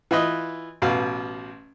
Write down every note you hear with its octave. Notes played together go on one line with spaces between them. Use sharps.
E3 F4 B4 D#5
A1 B2 F5